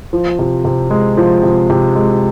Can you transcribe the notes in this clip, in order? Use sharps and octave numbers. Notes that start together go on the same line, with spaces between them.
F3
C3
C3
G#3
F3
C3
C3
G#3